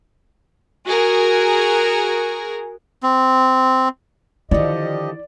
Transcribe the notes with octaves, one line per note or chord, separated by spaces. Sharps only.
F#4 G#4 A#4
C4
D3 D#3 F3 E4 G4 D5 D#5